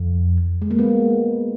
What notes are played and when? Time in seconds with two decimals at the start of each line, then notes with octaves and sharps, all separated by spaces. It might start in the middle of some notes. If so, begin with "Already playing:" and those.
Already playing: F2
0.62 G#3
0.71 A#3
0.78 G#3 B3